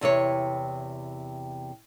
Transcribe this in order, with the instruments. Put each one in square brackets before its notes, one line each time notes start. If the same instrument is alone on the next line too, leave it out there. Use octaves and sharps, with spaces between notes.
[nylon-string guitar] E2 C3 E4 C#5